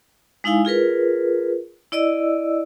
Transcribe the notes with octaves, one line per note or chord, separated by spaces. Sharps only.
G#3 D#4 E4 F5 G#5
F4 G#4 A#4 B4
E4 D5 D#5 E6